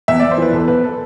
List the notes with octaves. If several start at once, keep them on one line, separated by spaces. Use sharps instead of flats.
E2 E5
E2 D5
C5
E3 B4
E2 A4
E2 B4
A4